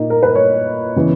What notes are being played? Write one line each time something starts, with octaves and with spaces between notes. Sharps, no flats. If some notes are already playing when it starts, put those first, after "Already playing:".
Already playing: A#2 A#3 D#4 D#5
A#4
B4
C#5
C#3 E3 B3